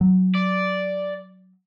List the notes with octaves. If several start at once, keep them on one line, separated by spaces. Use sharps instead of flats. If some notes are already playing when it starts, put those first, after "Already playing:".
F#3
D5